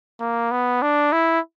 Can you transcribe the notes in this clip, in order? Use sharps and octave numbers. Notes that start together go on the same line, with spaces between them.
A#3
B3
D4
E4